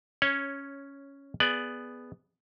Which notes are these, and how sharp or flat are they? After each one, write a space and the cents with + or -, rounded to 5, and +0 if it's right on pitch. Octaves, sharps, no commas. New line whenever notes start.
C#4 +0 C#5 -10
B3 +0 G#4 +0 D5 +0